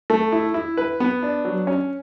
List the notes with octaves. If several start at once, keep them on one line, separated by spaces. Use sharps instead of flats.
A3
E4
E4
B4
B3
D4
F#3
C#4